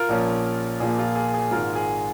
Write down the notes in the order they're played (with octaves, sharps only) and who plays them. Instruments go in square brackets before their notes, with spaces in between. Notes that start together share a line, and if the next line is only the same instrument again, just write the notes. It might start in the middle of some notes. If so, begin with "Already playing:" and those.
Already playing: [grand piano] F4 A#4
A#1 A#2 F3 C#4
A#1 A#2 F3 A#3 G#4
F4
G#4
G#4
G#1 G#2 G#3 F4 A#4
G#4